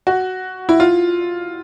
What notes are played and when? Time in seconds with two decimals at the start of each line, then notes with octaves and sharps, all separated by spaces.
0.07 F#4
0.69 E4
0.80 F4